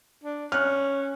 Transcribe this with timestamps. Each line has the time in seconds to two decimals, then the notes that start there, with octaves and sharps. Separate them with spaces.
0.24 D4
0.52 C#4 F6 F#6